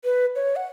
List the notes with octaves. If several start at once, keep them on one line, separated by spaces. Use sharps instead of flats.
B4
C#5
F#5